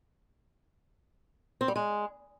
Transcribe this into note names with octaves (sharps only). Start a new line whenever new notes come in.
C4
G3
G#3